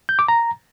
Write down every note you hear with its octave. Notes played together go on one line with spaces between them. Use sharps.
G6
D6
A#5